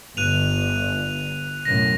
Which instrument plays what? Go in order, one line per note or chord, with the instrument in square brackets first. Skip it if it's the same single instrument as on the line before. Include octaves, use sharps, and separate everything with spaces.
[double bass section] G1 [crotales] F#6 D#7 F7
[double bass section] B1 F#2 A2 [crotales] A#6